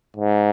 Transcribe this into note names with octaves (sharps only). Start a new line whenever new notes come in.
G#2